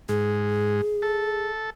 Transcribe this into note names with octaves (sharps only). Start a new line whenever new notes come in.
G#2 G#4
A4